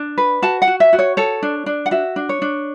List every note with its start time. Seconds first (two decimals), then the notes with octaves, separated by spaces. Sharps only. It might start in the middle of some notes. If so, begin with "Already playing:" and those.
Already playing: D4
0.18 B4
0.42 F#4 A5
0.62 F#5
0.67 F#4
0.80 E5
0.93 F#4
0.99 C#5
1.17 A4 C#5
1.43 D4
1.66 D4
1.86 F#5
1.91 F#4 E5
2.16 D4
2.29 C#5
2.42 D4